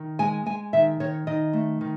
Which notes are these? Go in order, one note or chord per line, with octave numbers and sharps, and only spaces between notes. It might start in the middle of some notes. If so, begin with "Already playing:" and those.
Already playing: D#3
G#3 G#5
G#3 G#5
D#3 E5
D#3 C#5
D#3 D#5
A3
D#3